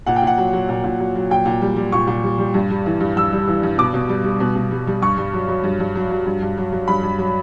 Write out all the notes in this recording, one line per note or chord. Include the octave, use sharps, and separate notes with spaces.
A#2 F#5
G5
A#2 F#5
F#3
F#3
A#2
A#2
F#3
F#3
A#2 G5
A#2
G3
G3
A#2 C#6
A#2
G3
G3
G2
G3
E3
G2
G2 E6
G3
E3
G2
B2 D6
B2
G3
G3
B2
B2
G3
G3
G2 C#6
G2
F#3
F#3
G2
G2
F#3
F#3
G2
G2
F#3
F#3
G2 B5
G2
F#3